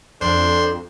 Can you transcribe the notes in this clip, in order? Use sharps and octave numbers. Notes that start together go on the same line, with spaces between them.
F2 D4 A4 C5 C6